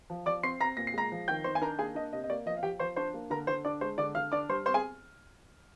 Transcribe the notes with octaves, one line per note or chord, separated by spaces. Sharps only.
F3
F3 D5 D6
C4 C6 C7
C4 A#5 A#6
A#2 A#6
C7
G#3 A#5 A#6
F3
D#3 G5 G6
D#3 C5 C6
G#5
D4 A#4 A#5
A#3 G#4 G#5
D4 D#5
C3 D#5
D#5
A#3 D5
F3 D#5
F5
F3 G4 G5
F3 C5 C6
D4 C5 C6
A#3
D3 A#4 A#5
D3 C5 C6
D4 D5 D6
G#3 C5 C6
D3 D5 D6
D3 F5 F6
D4 D5 D6
G3 C5 C6
C4 C5 C6
G#4 G#5